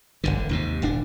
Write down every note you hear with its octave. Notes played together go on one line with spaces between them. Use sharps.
E1 A#1 D3
D#2 G#2 C3
D#1 G#1 D4